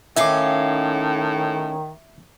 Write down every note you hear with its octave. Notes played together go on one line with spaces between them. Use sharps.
A2 D#3 C#4 D#4 E5 F5 D6